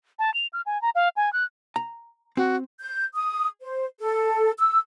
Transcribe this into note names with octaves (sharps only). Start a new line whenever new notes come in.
A5
F7
F6
G#5
A#5
F5
G#5
F#6
A#5
C4 F#4
G6
D#6
C5
A4
E6